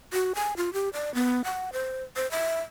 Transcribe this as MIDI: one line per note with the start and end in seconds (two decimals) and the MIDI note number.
0.13 0.33 66
0.35 0.54 80
0.57 0.73 65
0.73 0.89 67
0.93 1.13 74
1.15 1.42 59
1.44 1.70 78
1.73 2.03 72
2.16 2.29 72
2.31 2.61 76